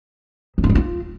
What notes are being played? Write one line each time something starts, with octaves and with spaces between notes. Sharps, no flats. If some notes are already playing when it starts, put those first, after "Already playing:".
F#3
F4
G3
F4